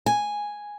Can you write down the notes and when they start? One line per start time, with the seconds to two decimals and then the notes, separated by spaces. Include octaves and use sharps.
0.06 G#5